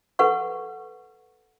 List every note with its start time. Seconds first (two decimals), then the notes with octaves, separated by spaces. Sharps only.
0.19 A4 B4 F#5 C#6